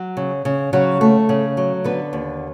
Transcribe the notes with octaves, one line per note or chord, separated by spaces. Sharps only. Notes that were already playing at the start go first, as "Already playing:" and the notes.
Already playing: F#3
C#3
C#3
C#3 F#3 F#4
A3
C#3
F#3
D3 B3 B4
D#2